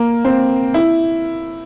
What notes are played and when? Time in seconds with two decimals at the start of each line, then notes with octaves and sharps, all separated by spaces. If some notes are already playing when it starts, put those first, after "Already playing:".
Already playing: A#3
0.25 C4
0.74 E4